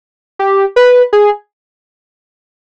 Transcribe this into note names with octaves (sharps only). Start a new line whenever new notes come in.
G4
B4
G#4